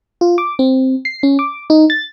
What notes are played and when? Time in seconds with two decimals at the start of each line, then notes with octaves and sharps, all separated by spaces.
0.21 F4
0.38 D6
0.59 C4
1.05 C7
1.23 C#4
1.39 D6
1.70 D#4
1.90 A6